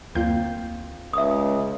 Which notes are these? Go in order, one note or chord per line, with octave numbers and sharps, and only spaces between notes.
D2 A#3 C4 F4 G6
C#2 E5 D#6